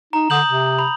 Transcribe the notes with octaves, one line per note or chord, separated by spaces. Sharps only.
D#4 A#5
D3 D#6 G6 F#7
C3
B5